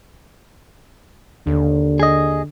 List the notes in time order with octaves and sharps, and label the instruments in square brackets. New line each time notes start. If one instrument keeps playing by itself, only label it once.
[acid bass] D#2 [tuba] D3
[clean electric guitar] G#4 D#5